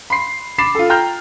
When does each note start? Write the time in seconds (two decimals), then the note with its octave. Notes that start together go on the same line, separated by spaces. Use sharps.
0.10 B5 C6 C7
0.58 B5 D6 A6 C7 E7
0.75 F4 A4
0.90 G5 A#5 F6 G6